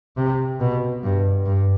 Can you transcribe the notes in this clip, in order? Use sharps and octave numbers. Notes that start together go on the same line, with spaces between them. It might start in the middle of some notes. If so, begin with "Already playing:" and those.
C3
B2
G2
G2